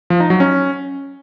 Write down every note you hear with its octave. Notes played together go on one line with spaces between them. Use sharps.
F3
D#4
F#3
C#4